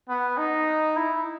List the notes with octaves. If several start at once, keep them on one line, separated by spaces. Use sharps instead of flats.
B3
D#4
E4